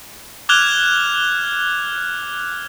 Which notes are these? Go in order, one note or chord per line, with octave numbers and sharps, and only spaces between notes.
D6 F6 F#6 G#6 F7 G7